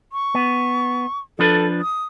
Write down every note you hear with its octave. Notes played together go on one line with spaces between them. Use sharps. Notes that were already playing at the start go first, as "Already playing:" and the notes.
C#6
B3
F3 D4 A4 B4
D#6